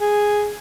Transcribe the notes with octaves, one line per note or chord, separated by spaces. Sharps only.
G#4